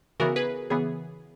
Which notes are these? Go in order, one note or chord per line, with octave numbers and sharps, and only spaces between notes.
C#3 E3 B3 F#4 A#4
G#4 B4
C#3 E3 B3 G#4